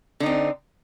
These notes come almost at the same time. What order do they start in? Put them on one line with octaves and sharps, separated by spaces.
D3 D#4 C4